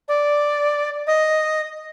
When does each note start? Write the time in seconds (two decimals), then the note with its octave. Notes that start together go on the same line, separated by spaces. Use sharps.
0.08 D5
1.07 D#5